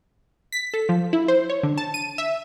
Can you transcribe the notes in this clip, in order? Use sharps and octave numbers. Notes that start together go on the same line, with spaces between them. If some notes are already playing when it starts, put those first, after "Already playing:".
B6
A4
F3
E4
C5
C#5
D3
A5
D#7
E5